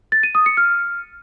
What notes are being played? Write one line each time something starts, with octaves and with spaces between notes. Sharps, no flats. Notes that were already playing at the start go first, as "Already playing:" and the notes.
A6
D#7
D#6
C#7
F6